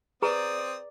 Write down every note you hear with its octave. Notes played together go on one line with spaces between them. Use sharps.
C4 G#4 B4 D5 A#5 D#6